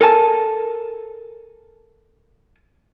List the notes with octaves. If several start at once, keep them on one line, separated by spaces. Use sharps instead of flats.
A4 A#4 G#5 A5